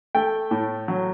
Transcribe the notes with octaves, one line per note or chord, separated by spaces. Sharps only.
A3 G5
A2
F#3